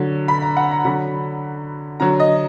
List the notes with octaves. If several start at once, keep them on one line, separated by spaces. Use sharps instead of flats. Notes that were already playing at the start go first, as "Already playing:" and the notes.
Already playing: D3 F#3
B5
A#5
F#5
A#5
D3 F#3 B5
D3 F#3 A#5
D#5